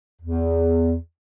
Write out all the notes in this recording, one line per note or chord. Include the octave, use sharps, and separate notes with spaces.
E2